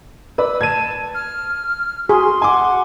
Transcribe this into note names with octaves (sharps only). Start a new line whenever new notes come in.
B4 D5 E6
A5 G#6 D#7
F6
F#4 G#4 C6
F#5 G#5 D6